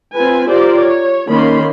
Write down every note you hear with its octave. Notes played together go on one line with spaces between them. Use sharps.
C4 F4 B4 G#5
F4 G4 A#4 C5 D5
C#5
D#3 A#3 C#4 B5 C6